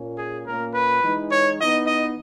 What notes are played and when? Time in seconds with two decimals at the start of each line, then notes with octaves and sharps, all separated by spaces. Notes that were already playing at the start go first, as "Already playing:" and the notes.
Already playing: A#2 A#3 C#4
0.17 G#4
0.46 A#2 A#3 C#4 A#4
0.74 B4
1.02 E3 G#3 D#4
1.30 C#5
1.59 E3 B3 D#4 D#5
1.87 D#5